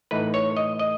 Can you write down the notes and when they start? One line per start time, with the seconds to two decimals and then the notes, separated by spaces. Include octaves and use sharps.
0.11 A2 E3 A3 D#4 B4
0.34 C#5
0.57 D#5
0.79 D#5